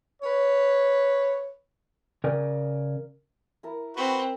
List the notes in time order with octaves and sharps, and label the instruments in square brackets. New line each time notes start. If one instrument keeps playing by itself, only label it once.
[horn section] B4 C#5
[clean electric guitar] C#3 A#4 D5 G#5
[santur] E4 A#4 A5
[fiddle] C4 [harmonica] F#4 B4